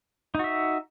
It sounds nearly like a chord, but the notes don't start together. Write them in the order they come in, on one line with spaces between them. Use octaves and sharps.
D#4 F#4 E5